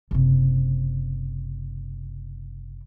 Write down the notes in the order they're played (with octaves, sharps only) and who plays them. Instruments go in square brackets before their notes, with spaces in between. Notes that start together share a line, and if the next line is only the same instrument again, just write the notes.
[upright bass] F#1 C3